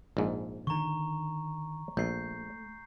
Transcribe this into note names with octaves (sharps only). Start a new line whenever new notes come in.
A#1 G#2
D3 D#3 A#5 C#6
A#1 A3 G6 C7